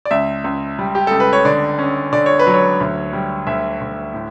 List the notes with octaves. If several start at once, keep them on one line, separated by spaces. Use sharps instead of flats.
D5
C#2 E5
C#2
G3
G4
C#2 A4
B4
C#5
D3 D5
C#4
D3 D5
C#5
B4
F#3
C#5
D2
G3
D2 E5
D2
A2